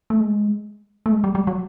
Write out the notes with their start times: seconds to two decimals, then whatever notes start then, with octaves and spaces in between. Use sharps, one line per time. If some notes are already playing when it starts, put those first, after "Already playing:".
0.10 A3
0.20 G#3
1.06 A3
1.12 G#3
1.24 G3
1.35 G3
1.47 F#3